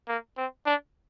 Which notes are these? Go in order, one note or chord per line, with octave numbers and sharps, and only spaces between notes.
A#3
C4
D4